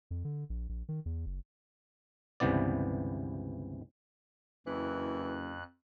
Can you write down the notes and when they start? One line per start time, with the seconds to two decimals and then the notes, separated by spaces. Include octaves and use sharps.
0.11 F2
0.25 D3
0.50 A#1
0.69 A#1
0.89 D#3
1.06 E2
1.26 F#1
2.40 G1 C#2 C3 E3 B3 D5
4.66 F#1 F2 E3 F#6